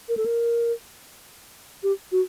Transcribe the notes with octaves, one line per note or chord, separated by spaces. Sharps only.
A#4
A4
A#4
G4
F#4